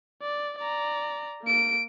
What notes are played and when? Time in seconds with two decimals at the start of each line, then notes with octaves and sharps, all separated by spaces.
0.22 D5
0.58 D5 A#5
1.43 A#3 D7